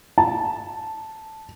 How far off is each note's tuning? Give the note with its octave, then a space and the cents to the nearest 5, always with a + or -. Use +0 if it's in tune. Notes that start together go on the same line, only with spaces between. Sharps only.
A5 -5